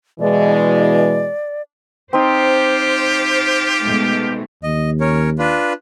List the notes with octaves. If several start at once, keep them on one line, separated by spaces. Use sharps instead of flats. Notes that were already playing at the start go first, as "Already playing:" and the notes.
B2 E3 G#3 D5
C4 D#4 F4 G4 C5
B2 G#3 A3
D#2 D#5
C#4 A#4 C#5
D4 F4 B4